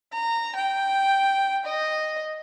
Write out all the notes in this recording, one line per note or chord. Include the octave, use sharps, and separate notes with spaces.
A#5
G5
D#5